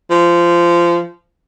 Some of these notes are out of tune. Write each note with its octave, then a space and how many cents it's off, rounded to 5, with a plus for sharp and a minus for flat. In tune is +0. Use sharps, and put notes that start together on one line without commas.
F3 -20